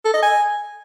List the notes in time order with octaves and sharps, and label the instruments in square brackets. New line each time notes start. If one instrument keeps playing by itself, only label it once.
[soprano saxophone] A4
D#5
G#5